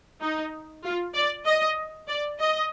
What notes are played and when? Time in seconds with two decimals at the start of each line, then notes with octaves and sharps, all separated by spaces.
0.21 D#4
0.83 F4
1.15 D5
1.45 D#5
2.08 D5
2.39 D#5